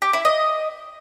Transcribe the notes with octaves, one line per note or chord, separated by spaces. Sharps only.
G4
E4
D#5